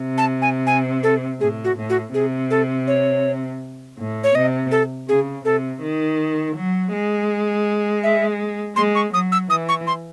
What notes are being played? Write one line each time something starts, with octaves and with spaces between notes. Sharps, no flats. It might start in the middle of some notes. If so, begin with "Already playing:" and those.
Already playing: C3
A5
G#5
G#5
A4
A2 G#4
F#4
A2
F#4
C3 G#4
A4
C#5
A2
C#5
C3 D#5
A4
C#3 G#4
C3 A4
D#3
F#3
G#3
E5
G#3 C6
C#6
F#3 D#6
E6
E3 D#6
C#6
C6